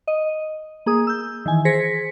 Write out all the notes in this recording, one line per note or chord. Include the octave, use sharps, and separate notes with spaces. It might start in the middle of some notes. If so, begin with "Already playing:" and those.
D#5
A#3 G#4 D#6
E6 G6
D#3 E3 G#5
G#4 C5 A#6 B6 C#7